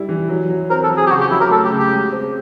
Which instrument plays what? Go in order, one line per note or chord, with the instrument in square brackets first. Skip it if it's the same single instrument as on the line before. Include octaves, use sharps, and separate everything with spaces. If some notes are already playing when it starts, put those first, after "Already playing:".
Already playing: [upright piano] G3 E4
E3
F#3
F#3
[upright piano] C4 [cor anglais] A#4
[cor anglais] A4
[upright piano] F#3
[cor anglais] G#4
G4
[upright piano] C#3 [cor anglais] F#4
[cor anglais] G4
[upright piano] F#3 [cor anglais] E4
[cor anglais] A#4
[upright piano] A3 [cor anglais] A4
[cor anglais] G4
[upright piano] C#3
[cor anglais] G4
[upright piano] G#3
C4